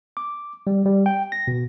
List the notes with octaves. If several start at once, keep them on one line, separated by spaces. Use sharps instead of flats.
D6
G3
G3
G5
A#6
B2